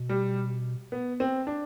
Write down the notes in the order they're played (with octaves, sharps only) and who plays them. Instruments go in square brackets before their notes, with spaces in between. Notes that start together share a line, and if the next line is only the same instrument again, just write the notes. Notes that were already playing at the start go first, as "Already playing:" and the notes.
Already playing: [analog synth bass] B2
[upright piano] G3
B3
C4
D4